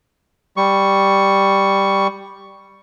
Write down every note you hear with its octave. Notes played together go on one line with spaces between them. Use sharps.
G3 C#6